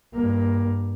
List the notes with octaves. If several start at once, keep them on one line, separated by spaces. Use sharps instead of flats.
G2 A#3